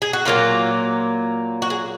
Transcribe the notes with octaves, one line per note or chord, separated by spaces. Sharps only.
G#4
F#4
A#2 F#3 A#3 F4
F#4
G#4